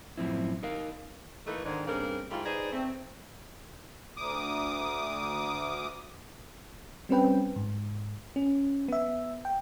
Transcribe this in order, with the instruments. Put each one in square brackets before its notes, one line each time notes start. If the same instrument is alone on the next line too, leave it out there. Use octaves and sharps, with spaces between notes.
[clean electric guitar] F#2 A2 F3 C4 E4
D#4 A#4 F5
[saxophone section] E3 A3 A#3 D#4 A4 B4
G#2 D3 D#3
G2 C#3 A#3 C4 A#4
G#2 G3 A3 F4
D#4 G#4 B4 C5 D5
A3 C4
[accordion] D2 D6 D#6
[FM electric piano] G3 C4 C#4 B4 G5
G#2
C#4
B3 E5
G5